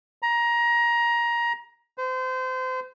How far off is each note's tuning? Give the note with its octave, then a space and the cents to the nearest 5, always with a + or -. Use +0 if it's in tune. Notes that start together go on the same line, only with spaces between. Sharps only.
A#5 +20
C5 -30